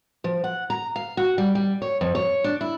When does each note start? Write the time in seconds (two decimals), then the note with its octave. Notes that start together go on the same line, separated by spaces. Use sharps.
0.24 F3
0.44 F#5
0.70 A#5
0.96 F5
1.17 F#4
1.38 G3
1.55 G3
1.82 C#5
2.01 F2
2.15 C#5
2.44 D4
2.61 E4